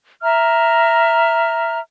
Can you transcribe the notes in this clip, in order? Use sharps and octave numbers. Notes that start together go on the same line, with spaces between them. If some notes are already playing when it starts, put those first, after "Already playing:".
E5 A#5 F6